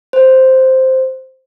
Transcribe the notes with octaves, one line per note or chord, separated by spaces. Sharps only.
C5